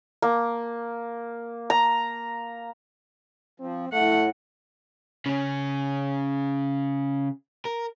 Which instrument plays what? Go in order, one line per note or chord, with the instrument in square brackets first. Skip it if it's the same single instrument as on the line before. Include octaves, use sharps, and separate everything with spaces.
[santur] A#3
A#5
[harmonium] F3 [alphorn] C4
[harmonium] A2 [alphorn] A3 [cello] F#5
[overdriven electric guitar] C#3 C#4
A#4